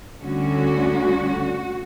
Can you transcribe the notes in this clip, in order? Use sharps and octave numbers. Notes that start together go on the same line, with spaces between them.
D2 D3 G3 C#4 F#4